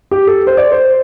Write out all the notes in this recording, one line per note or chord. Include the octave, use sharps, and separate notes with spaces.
G4
A4
C5
D5
C5